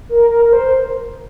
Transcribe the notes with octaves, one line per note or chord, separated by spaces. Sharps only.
A#4
A#4
A#4
C5